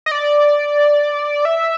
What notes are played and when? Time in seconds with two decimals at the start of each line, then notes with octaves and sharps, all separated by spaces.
0.06 D#5
0.11 D5
1.45 E5